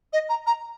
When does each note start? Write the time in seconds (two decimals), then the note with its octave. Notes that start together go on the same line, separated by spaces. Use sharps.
0.12 D#5
0.29 A#5
0.46 A#5